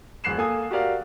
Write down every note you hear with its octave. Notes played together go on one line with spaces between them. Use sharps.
E1 A#1 F#6 C7 E7
A#3 A4 G#5 D#6
F#4 G4 A#4 D5 F5 F#5